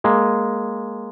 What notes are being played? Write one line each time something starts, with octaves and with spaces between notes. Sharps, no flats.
G#3 A#3